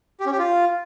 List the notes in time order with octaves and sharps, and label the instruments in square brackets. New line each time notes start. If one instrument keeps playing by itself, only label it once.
[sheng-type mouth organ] G4
C#4
G4
F4